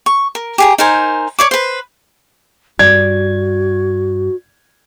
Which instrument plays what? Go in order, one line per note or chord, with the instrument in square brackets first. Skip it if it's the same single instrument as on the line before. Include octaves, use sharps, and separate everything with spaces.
[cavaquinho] C#6
A#4
G4 G#4 A#5
D#4 A#4 C5 G#5
C#5 D5 D6
B4 C5
[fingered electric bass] G2 [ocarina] F#4 [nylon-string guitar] D5 [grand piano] G#6